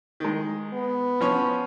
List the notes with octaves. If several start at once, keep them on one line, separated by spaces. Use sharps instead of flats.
D#3 G#3
B3
F3 C#4 C#5